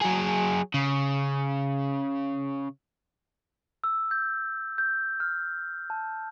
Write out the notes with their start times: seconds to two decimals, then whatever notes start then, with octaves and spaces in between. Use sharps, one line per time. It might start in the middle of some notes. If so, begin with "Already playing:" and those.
0.02 F#3 G#4
0.74 C#3
3.84 E6
4.11 G6
4.78 G6
5.20 F6
5.90 A5